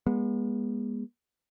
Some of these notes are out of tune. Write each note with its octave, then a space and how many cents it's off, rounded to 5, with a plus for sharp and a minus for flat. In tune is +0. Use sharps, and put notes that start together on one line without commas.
G#3 -20 B3 -40